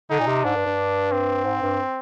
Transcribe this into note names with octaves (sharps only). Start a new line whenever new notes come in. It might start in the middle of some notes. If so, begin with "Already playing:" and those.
D3 D#4
A#2
C3
G#2 D4
G2
G2
C4
G#2
G2